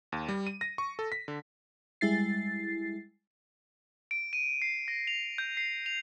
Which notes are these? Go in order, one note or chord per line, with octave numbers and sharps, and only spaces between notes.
D#2
G3
D#7
A#6
C#6
A4
B6
D3
G3 G#3 E4 A6 C7
D7
D#7
C7
A#6
F7
G6
C7
F7